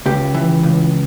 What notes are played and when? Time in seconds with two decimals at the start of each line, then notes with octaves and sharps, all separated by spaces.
0.06 C#2 G4
0.34 E3
0.63 C#2